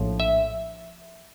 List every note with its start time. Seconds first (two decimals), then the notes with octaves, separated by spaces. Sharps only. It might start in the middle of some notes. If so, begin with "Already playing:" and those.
Already playing: A#1 A2 F3
0.20 E5